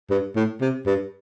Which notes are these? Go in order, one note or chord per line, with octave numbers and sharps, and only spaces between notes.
G2
A2
C3
G2